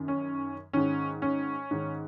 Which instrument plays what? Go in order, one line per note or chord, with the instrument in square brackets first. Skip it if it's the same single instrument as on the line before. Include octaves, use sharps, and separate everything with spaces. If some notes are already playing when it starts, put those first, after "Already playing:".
Already playing: [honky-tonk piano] F#2 D#3
C#4
G#2 D#3 C#4
C#4
G#2 D#3